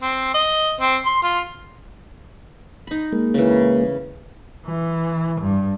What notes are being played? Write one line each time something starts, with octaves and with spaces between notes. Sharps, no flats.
C4
D#5
C4
C6
F4
D#4 B5
G#3 A#3
C#3 E3
E3
G2